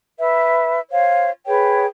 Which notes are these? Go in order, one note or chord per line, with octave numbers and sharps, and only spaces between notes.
B4 E5
C5 C#5 F5
G#4 B4 C#5 G5